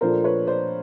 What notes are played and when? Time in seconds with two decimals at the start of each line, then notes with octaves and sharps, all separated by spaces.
0.01 A#2 F3 A3 D4 A#4 C5
0.24 B4 C#5
0.47 C5 D5